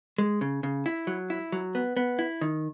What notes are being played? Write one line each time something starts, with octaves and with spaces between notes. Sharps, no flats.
G#3
C#3
C#3
E4
F#3
E4
F#3
B3
B3
E4
D#3